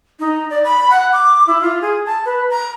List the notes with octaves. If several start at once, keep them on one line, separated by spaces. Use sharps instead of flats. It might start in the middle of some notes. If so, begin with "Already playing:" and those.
D#4
D5
B5
F#5
D6
E4
F4
G#4
A5
B4
A#5